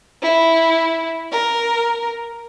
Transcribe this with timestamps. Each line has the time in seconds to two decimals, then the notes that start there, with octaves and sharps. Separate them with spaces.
0.22 E4
1.32 A#4